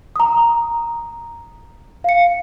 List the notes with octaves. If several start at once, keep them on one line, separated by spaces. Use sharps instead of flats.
A#5 D#6
F5 C#7